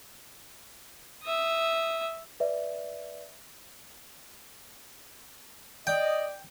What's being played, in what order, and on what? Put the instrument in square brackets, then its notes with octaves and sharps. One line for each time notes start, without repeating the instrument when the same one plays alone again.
[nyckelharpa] E5 D#6
[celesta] B4 D5 E5
[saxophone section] D5 [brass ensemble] D#5 [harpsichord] G5